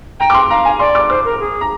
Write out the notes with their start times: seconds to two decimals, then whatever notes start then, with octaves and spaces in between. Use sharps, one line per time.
0.20 G5 A#5
0.30 D6
0.34 C6
0.50 F5 A#5
0.65 G#5
0.79 D5 C6
0.95 D6
1.09 C5 D6
1.25 A#4
1.40 G#4
1.61 A#5